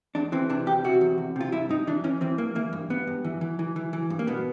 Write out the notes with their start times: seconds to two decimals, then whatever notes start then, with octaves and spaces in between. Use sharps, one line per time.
0.15 E2 D4
0.32 E3 C4
0.50 C3 D4
0.67 E2 G4
0.84 C3 F#4
1.01 E2
1.18 E2
1.36 C3 F4
1.52 G2 E4
1.69 G2 D#4
1.87 E3 D4
2.04 E3 C#4
2.21 E3 C4
2.38 G2 A#3
2.55 E3 A#3
2.73 G2
2.90 G2 B3
3.07 G2
3.25 E3
3.41 E3
3.59 E3
3.76 E3
3.93 E3
4.10 G2
4.19 A#3
4.27 B2 B3